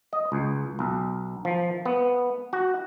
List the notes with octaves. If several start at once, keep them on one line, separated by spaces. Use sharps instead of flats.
D#5
C#2
B1
F3
B3
F#4